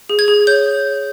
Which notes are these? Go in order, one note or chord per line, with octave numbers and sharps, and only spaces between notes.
G#4
G#6
G#4
C#5 G6